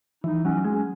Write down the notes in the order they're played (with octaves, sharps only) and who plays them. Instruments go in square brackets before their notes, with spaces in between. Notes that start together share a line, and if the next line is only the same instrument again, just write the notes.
[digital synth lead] E3 [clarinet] D#4
[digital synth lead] F#3 [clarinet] C#4
[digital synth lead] G#3 [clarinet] C#4